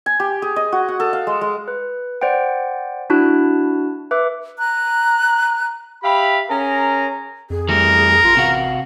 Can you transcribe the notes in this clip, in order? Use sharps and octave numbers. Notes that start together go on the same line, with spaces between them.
G#5
G4
G#4
D#5
F#4
F#5
A4
F5
G#3
G#3
B4
C5 D5 F#5 G5
D4 E4 F#4 A5 F#6
B4 E5 D6
A#5 F#6
G4 E5 F5 B5
C#4 G#4 A#4 A#5
F2 G#4
E3 G3 A3 A#4
A1 F4
C3 F#4 F5